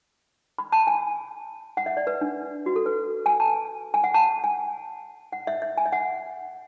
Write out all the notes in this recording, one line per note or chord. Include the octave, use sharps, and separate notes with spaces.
B5
A5
G#5
F#5
E5
D5
B4
D4
F#4
A4
B4
G#5
A5
G#5
F#5
A5
G#5
F#5
E5
E5
G#5
E5
F#5